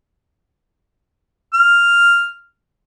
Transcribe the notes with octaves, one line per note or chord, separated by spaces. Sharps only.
F6